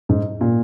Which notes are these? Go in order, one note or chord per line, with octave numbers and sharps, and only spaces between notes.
G#2
A#2